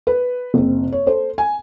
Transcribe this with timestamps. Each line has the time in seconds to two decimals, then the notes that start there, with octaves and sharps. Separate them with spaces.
0.07 B4
0.54 F#1 C4
0.92 C#5
1.06 A4 C5
1.38 G#5